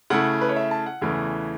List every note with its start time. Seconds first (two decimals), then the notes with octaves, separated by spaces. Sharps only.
0.10 C#3 A3 E4 F#5
0.41 B4
0.49 C#5
0.56 E5
0.71 A5
0.86 F#5
1.02 E2 C#3 E3 A3 E4